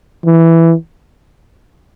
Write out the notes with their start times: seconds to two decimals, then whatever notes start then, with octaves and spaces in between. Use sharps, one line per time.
0.25 E3